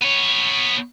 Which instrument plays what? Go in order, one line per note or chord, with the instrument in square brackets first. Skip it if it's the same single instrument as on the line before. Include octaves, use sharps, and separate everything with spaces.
[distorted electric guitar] B3 C#5